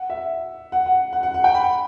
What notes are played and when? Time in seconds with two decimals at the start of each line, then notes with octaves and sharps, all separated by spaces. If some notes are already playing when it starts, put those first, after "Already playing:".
Already playing: F#5
0.10 E5
0.72 F#5
0.86 F#5
1.13 F#5
1.23 F#5
1.34 F#5
1.44 G5
1.55 B5